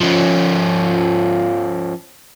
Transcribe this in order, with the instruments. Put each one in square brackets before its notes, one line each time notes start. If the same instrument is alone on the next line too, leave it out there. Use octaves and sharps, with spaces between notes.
[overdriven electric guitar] F3 C#4